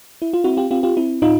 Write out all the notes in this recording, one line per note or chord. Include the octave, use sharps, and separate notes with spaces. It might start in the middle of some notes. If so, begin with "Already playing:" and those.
E4
F4
C4 E4 F#4
F4 G4
C4 F4 G4
F4 G4
C4 E4
A2 D#4 F4